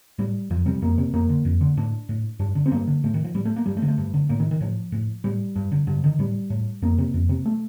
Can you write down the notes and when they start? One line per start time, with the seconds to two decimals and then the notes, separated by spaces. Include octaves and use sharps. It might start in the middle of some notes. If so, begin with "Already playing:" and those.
0.18 A2 G3
0.50 F2 F3
0.66 C3 G3
0.82 F2 A#3
0.98 C3
1.13 F2 A#3
1.29 D3
1.45 F2
1.61 D3
1.77 A2 D4
2.09 A2
2.39 G2 D4
2.55 D3
2.66 C4
2.72 G2 A#3
2.87 D3
3.04 A2 A3
3.14 D#3
3.24 F3
3.34 A2 G3
3.45 A3
3.56 A#3
3.66 G2 G3
3.77 A3
3.82 D3
3.88 A3
3.98 G2
4.14 D3
4.29 A2 A#3
4.40 D#3
4.51 D#3
4.61 A2 F3
4.92 A2
5.24 A2 G3
5.56 G2
5.72 D3
5.87 G2 D3
6.04 D3 D#3
6.19 A2 G3
6.50 A2
6.82 F2 A#3
6.98 C3
7.14 F2
7.29 C3
7.46 A3